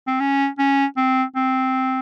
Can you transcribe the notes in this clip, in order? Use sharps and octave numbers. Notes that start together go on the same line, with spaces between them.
C4
C#4
C#4
C4
C4